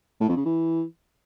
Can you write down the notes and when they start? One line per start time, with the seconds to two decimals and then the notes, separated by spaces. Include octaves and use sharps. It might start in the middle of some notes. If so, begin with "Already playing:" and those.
0.20 A2
0.29 F2
0.37 C#3
0.45 E3